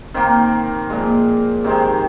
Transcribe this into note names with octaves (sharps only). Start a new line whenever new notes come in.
D#3 A#3 C4
A#2 F3 G#3
C3 D#3 G#3 C4